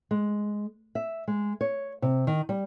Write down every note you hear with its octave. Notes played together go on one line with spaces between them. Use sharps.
G#3
E5
G#3
C#5
C3
D#3
G3